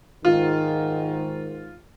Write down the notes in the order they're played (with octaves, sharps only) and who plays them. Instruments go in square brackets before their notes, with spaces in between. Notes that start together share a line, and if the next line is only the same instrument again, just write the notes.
[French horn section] G#2 D#3 [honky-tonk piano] F4